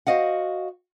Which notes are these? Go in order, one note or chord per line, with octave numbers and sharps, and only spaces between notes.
F#4 C5 D#5 F5 F#5